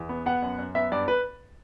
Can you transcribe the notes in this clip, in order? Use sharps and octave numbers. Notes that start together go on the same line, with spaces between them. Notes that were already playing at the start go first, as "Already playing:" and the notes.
Already playing: E2
B3
B3 F#5
F#2
F#2
B3 E5
G2 D5
B4